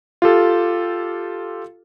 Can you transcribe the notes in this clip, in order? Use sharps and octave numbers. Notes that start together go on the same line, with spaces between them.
F4 G4 A4